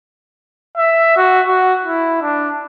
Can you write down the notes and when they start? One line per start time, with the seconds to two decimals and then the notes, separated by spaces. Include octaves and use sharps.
0.77 E5
1.17 F#4
1.47 F#4
1.85 E4
2.23 D4